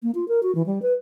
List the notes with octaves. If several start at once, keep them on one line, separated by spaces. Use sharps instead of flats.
A#3
F4
A#4
F#4
E3
G3
B4